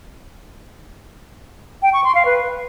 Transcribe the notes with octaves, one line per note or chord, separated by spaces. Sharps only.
G5
C#6
C6
F5
B4